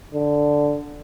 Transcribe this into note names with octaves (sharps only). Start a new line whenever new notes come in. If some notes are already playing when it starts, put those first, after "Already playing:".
D3